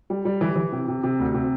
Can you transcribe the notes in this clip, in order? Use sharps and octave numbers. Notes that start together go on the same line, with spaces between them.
G3
G3
E3
E3
C3
C3
C3
D2
C3